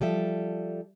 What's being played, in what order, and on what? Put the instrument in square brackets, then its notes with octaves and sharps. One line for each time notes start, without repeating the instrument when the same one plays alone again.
[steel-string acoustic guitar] F3 G3 A4 E5